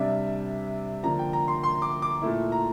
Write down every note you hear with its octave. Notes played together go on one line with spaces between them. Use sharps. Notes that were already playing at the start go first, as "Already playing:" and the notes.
Already playing: C3 G3 D4 E5
D3 F3 A#3 A#5
G5
A#5
C6
C6
D6
D6
A#2 A3 E4
A#5